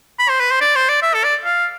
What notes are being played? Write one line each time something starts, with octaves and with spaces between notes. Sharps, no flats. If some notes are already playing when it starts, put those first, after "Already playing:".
B5
C5
B4
C5
D5
C5
D5
E5
A4
D5
F5